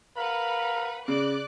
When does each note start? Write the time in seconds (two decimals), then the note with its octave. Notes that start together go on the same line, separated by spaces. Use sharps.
0.17 A#4 B4 F5 F#5 B5
1.08 C#3 D5 D6 F#6